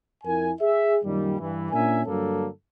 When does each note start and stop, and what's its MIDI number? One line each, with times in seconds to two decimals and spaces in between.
0.24 0.50 41
0.24 0.50 64
0.24 0.50 70
0.24 0.50 80
0.61 0.96 68
0.61 0.96 76
1.04 1.38 42
1.04 1.38 46
1.04 1.38 51
1.04 1.38 55
1.39 1.68 43
1.39 1.68 52
1.71 2.01 46
1.71 2.01 61
1.71 2.01 62
1.71 2.01 70
1.71 2.01 76
1.71 2.01 80
2.06 2.46 43
2.06 2.46 50
2.06 2.46 54
2.06 2.46 58
2.06 2.46 69